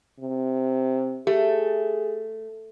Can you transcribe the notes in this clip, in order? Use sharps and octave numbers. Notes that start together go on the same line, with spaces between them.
C3
A3 G4 G#4